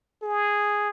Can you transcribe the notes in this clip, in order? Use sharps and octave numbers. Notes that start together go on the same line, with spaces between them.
G#4